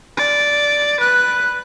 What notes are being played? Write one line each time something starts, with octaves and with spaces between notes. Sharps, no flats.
D5
B4 F#6